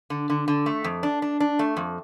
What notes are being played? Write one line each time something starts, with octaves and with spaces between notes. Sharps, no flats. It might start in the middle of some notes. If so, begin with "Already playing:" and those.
D3
D3
D3
A3
F2
D4
D4
D4
A3
F2